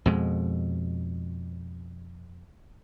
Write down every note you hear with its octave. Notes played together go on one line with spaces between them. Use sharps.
F2 B2 G#3